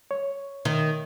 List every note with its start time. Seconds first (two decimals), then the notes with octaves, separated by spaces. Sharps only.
0.11 C#5
0.65 D#3